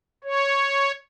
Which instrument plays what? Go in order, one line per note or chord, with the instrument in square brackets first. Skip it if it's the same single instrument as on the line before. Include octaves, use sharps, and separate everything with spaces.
[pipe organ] C#5